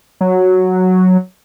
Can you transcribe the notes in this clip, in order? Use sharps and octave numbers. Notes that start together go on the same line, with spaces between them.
F#3